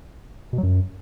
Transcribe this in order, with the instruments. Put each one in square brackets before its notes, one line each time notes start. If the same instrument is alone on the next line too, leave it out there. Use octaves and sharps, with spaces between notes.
[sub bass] B2
F#3
F#2